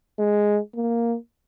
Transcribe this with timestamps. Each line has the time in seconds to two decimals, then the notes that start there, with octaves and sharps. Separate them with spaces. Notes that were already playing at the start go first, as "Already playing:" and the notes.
0.19 G#3
0.76 A#3